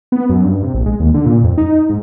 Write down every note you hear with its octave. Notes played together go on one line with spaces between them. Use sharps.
B3
F#2
G2
C3
A#1
G#3
D#2
D3
A#2
F2
D#4
G#2